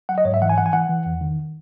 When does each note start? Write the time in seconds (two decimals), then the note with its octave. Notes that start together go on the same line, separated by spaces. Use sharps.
0.09 F#3 F#5
0.18 D#5
0.25 G#2 C#5
0.34 E5
0.42 E3 F#5
0.50 G#5
0.58 E3 F#5
0.66 G#5
0.73 E3 F#5
0.89 E3
1.06 E2
1.21 D#3